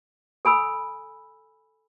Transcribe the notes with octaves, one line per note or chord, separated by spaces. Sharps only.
A4 G#5 B5 E6